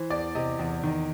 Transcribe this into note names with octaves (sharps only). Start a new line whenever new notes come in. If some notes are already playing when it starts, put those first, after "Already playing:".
Already playing: E3 C5
E2 D5
C3 D#5
E2
D#3